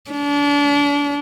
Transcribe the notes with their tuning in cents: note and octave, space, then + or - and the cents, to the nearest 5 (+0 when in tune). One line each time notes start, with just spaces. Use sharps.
D4 -35